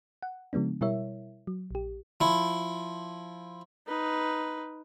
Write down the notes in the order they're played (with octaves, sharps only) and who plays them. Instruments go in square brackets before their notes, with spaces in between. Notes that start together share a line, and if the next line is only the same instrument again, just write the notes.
[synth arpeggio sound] F#5
C#3 F3 G#3 B3 D4
B2 G3 E4 A#4 C#5 E5
F#3
A#1 G4
[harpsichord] F3 E4
[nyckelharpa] D#4 B4